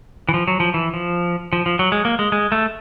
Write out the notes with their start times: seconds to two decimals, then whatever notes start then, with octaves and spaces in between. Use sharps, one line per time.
0.29 E3
0.34 F3
0.48 F#3
0.60 F3
0.74 E3
0.94 F3
1.53 F3
1.66 F3
1.79 F#3
1.92 G#3
2.05 A#3
2.19 G#3
2.32 G#3
2.52 A3